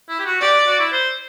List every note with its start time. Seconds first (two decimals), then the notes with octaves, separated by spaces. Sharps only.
0.09 E4
0.19 G4
0.25 F#4
0.41 G4 D5
0.67 F#4
0.79 E4
0.92 C5